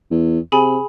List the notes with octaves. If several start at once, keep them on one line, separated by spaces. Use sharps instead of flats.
E2
C3 G#4 G#5 B5